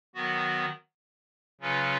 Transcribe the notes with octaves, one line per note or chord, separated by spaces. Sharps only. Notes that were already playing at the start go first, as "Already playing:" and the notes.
D#3 F#3 B3 F#4
C#3 F#3 C#4 F4 B4